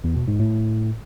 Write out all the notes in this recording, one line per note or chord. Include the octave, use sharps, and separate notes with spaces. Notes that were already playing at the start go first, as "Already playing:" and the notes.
E2
B2
G#2
A2